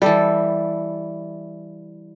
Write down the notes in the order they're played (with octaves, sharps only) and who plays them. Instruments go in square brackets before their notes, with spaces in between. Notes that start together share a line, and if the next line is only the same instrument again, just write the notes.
[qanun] E3 A4 [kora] G3